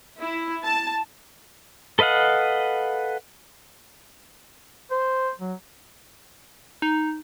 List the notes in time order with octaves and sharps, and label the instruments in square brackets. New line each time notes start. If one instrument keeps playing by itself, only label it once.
[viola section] E4
A5
[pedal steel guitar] A4 B4 D#5 F5 F#5
[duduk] C5
F#3
[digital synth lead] D#4